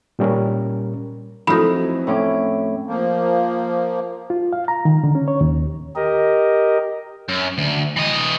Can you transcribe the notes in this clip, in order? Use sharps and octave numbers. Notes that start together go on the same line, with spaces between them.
A#2 G3 C#4 A#4
F2 E3 F#3 A3 D#4 B5
A2 C#4 D6
F3 A#3
F4
F5
A#5
D#3
D3
C#4
C#5
D#2
G4 A#4 D#5
F#2
D2
E3 D#5